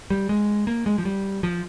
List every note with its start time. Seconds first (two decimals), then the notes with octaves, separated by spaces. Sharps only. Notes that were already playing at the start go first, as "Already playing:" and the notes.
0.10 G3
0.29 G#3
0.67 A#3
0.86 G#3
0.98 F3
1.05 G3
1.43 F3